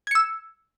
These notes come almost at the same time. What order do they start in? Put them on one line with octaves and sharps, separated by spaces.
G#6 C#7 E6